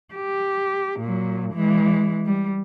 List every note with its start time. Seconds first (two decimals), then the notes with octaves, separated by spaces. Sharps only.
0.14 G4
1.00 A#2 F#3
1.53 E3 G#3
2.26 G3